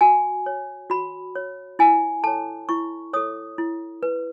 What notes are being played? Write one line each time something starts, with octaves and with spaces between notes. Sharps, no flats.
F#4 G#5
C#5
F#4 B5
C#5
E4 G#5
A4 C#5 A5
E4 C#6
A4 C#5 D#6
E4
B4